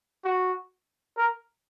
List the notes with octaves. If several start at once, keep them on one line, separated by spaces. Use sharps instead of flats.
F#4
A#4